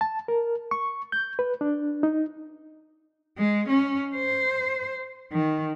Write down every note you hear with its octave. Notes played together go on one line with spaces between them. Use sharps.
A5
A#4
C#6
G6
B4
D4
D#4
G#3
C#4
C5
D#3